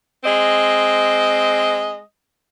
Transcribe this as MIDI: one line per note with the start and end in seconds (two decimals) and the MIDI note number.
0.25 2.00 56
0.25 2.00 60
0.25 2.00 75